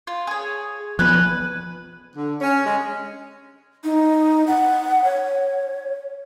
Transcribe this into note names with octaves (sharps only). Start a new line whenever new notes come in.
F4
G#4 C#5
F3 B3 B4 G#5 F#6
D3
C#4
G#3
D#4
F#5
C#5